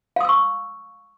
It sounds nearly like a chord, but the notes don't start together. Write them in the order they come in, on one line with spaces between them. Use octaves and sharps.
F5 D#6 E6 C#6